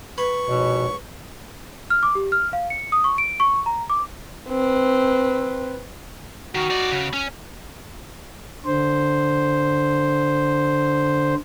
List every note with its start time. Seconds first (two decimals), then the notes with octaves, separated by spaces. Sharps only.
0.18 B4 C#6
0.49 A#1 G#2 B2 C#5
1.90 F6
2.03 D6
2.15 G4
2.32 F6
2.53 F5
2.70 C#7
2.92 D#6
3.04 C#6
3.18 D7
3.40 C#6
3.66 A#5
3.90 D6
4.49 C4 B4
6.55 D#3 F#4
6.70 D#4 D5
6.92 C#3
7.13 C#4
8.65 D3 C5